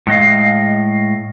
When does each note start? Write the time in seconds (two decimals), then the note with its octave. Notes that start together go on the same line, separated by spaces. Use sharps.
0.07 A2 G#3 D#5 F5